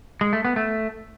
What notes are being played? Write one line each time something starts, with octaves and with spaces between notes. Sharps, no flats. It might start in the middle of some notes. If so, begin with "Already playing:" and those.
G#3
A3
B3
A3